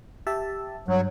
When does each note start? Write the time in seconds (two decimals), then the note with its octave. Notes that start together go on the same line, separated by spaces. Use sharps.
0.27 G4 E5 A5
0.88 G2 F#3